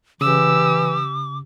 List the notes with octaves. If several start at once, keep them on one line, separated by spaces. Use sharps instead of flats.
C#3 E3 G4 D6 E6